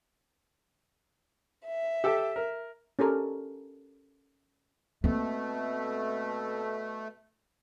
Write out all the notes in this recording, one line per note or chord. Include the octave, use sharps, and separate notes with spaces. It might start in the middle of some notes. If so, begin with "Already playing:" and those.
E5
G4 A4 G5
A#4
C#4 G4 A4 A#4
B2 A3 A#3 C4